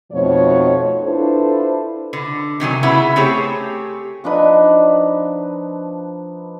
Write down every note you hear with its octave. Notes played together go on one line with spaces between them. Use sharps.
F2 B2 F3 A3 D#4 C#5
D4 E4 F4 A4 B4 C5
D3
C3 D#3 F#3 G#5
C#3 B3 E4
A3 C4 G4 G#4 C#5
F3 D4 D#4 B4